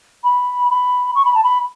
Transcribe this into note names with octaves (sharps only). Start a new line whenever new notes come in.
B5
B5
C#6
B5
A5
B5